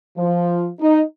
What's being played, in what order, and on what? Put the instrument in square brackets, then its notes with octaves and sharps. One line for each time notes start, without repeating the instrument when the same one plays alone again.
[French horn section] F3
D#4